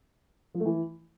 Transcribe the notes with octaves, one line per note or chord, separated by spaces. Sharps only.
F3
A3
E3